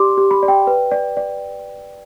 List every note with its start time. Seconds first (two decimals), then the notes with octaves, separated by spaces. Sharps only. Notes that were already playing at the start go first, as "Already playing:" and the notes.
Already playing: G4 D5 C6 D6
0.17 G4
0.31 B5
0.43 D5
0.48 G5
0.67 B4
0.91 D5
1.17 D5